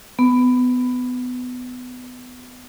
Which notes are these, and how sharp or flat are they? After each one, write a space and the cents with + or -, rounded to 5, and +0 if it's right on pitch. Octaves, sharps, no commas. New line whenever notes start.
B3 +20